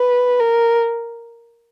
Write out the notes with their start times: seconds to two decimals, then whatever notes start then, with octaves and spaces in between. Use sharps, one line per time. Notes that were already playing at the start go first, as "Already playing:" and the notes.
Already playing: B4
0.39 A#4